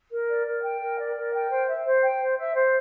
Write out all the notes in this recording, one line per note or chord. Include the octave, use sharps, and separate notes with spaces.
A#4
D5
A#4
G5
A#4
D5
A#4
G5
C5
E5
C5
G5
C5
E5
C5